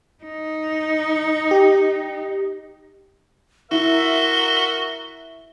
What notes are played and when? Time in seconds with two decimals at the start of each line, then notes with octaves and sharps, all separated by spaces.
0.24 D#4
1.51 G4
3.71 E4 F#4 A#4 E5 G7